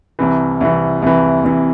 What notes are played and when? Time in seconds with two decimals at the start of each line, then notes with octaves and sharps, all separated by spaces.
0.19 C2 C3 E3
0.61 C2 C3 E3
1.02 C2 C3 E3
1.44 C2 C3 E3